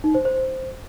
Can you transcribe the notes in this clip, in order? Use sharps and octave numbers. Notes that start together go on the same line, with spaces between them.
D#4
C5
C5